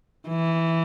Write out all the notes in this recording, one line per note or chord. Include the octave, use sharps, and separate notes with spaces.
E3